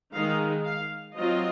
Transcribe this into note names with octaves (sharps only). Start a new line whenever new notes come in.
D#3 G#3 D#4 F5
F5
F#3 C4 F4 D#5